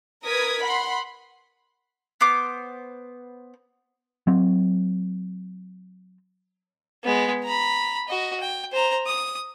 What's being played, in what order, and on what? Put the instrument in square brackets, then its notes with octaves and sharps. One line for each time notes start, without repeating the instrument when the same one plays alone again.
[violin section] A#4 B4 D#6 G#6 B6
F#5 B5 C6
[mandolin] B3 C5 D6
[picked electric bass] F#3 C4
[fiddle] G#3 B3
A#5 B5
F#4 D#5
G5
C5 A#5
D#6